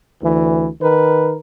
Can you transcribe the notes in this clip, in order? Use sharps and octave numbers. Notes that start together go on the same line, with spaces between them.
D2 E3
D#3 A#4 B4